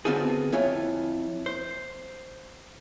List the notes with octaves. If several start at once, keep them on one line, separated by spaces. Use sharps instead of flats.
D3 B3 C4 F4 F#4 G#4
F2 E4 F4 C#5 G#5
C5